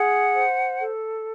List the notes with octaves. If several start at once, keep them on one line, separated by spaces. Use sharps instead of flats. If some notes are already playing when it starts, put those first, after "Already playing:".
Already playing: G#4 F#5
C5
A4